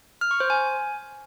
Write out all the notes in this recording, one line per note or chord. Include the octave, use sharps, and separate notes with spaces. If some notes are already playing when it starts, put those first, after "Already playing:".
F6
C#6
C5
G#5